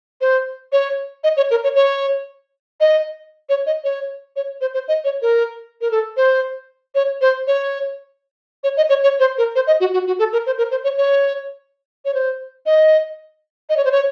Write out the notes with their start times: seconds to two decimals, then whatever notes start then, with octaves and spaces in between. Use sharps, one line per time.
0.21 C5
0.72 C#5
1.24 D#5
1.37 C#5
1.51 A#4
1.64 C#5
1.76 C#5
2.81 D#5
3.49 C#5
3.66 D#5
3.84 C#5
4.36 C#5
4.61 C5
4.74 C5
4.88 D#5
5.04 C#5
5.22 A#4
5.81 A#4
5.91 A4
6.17 C5
6.95 C#5
7.21 C5
7.47 C#5
8.64 C#5
8.77 D#5
8.89 C#5
9.03 C#5
9.20 C5
9.38 A#4
9.55 C5
9.67 D#5
9.80 F#4
9.93 F#4
10.07 F#4
10.19 A4
10.33 A#4
10.46 C5
10.58 A#4
10.71 C5
10.84 C#5
10.98 C#5
12.05 C#5
12.14 C5
12.66 D#5
13.69 D#5
13.77 C#5
13.85 C5
13.92 C#5